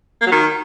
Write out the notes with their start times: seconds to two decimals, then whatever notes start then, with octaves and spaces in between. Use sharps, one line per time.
0.21 A#3
0.26 F#3
0.32 D#3